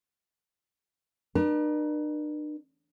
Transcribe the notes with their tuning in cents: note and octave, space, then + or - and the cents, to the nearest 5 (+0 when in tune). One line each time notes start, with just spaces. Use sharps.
D4 +45 A#4 +45